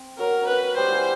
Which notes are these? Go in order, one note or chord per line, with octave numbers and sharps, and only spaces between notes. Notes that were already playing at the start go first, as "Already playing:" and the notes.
Already playing: C4
F#3 A#4
B4
G3 C5
E3